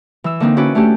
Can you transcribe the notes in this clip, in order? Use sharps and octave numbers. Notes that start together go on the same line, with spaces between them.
E3 E6
D3 A#3 C4 D4 D#4
C#4 E4 F#4 B4 D5
A3 C#4 D4 G4